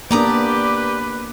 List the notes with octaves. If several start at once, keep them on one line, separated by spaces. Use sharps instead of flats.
A#3 B3 D4 G4 B4 D5 A#5 D#6